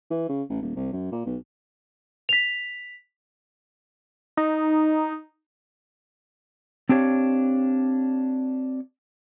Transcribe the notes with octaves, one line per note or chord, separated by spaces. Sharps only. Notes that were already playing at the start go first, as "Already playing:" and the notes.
E3
C#3
A1
D#1
C2
F#2
A#2
B1
B6 F7
D#4
C4 D4 G4 C#5 F5